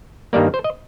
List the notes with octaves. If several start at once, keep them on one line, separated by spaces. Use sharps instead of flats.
G2 D#3 G3 A#3 D5
C5
D#5